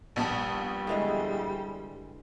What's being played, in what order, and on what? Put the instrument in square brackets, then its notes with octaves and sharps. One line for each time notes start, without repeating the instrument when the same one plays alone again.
[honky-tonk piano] A#1 B3 A5 [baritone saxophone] G3
[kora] D3 E3 G#3